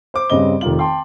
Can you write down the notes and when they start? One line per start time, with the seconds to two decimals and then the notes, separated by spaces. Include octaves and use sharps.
0.14 C5 D6
0.30 G2 C#3 C4 D#5 G7
0.61 F1 D#3 F4 F#7
0.79 G5 A5 C6